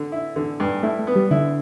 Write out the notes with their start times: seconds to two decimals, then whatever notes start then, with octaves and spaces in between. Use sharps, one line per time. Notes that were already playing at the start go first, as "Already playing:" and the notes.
Already playing: D3
0.12 E4
0.36 D3
0.60 G2
0.83 A3 E4
0.99 A3
1.07 B3
1.16 G3
1.31 D3 E4